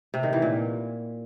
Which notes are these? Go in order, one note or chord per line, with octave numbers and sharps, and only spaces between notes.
C3
D#3
E3
A#2